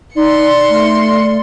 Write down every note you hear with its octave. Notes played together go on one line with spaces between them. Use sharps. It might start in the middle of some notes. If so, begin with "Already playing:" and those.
D#4 D5 C6 C#7
A3